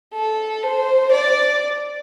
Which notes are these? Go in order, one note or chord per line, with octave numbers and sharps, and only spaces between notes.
A4
C5
D5